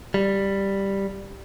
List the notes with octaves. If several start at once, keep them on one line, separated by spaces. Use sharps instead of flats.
G3